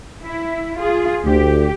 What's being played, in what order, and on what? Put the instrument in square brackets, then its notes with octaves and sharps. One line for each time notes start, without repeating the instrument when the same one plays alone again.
[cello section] E4
F4 G#4
[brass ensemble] D2 [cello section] G4